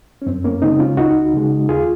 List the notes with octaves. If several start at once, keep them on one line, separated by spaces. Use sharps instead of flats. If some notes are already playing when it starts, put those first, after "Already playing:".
C#4
F#2 C4
A#3 C#4
C#3 G#3 C4 D#4
C#4 F4
C#2 D#4 F#4
C#3 G#3
D#2 F4 G#4